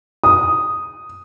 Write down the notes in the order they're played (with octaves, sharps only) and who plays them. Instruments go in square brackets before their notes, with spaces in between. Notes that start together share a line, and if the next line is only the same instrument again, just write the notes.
[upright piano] D#6